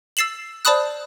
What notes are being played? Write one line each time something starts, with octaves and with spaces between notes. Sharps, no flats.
E6 A6 C7 E7 F#7
C5 D5 A5 B5 D#6 F#6